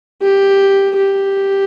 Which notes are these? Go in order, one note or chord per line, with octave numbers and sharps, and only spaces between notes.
G4
G4